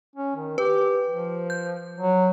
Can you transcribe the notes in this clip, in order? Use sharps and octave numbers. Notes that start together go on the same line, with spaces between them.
C#4
D#3
G4 B4
F3
G6
F#3